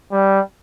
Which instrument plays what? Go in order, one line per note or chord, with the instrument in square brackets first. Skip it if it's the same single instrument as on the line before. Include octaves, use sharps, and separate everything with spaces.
[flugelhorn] G3